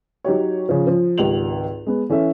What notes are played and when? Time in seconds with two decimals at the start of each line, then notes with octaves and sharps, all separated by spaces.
0.24 F#3 D#4 G4 C#5
0.69 C#3 F3
0.87 F3
1.18 G#1 C#2 G4 F7 F#7
1.87 G#3 B3
2.09 E3 C#4 A4 E5